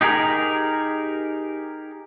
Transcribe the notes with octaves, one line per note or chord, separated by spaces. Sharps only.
D#4 G4 G#4 A#4